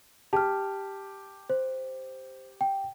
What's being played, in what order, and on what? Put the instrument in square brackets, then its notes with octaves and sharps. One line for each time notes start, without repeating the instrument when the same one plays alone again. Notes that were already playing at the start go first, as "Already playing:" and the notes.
[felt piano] G4 [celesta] A5 F6
[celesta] C5
G5